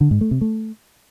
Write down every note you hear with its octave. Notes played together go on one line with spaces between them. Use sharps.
D3
G#2
A3
C3
A3